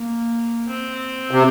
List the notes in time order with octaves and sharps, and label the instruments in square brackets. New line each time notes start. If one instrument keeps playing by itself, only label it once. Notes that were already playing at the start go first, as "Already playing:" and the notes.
Already playing: [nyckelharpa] A#3
C4
[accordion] C3